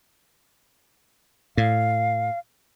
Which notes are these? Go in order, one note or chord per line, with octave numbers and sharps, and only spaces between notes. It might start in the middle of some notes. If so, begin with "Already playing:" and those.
A2 F5